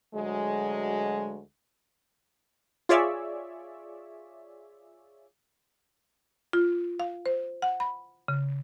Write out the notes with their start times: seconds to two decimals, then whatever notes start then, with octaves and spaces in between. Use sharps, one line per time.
0.14 D2 F#3 G#3
2.89 F4 G#4 C#5 D5 E5
6.53 F4
7.00 F5
7.26 C5
7.62 F#5
7.80 B5
8.28 C#3